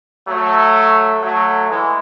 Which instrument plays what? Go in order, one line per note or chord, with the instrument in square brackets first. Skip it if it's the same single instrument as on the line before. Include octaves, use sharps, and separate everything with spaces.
[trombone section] F#3 A3
F#3 A3
E3 G#3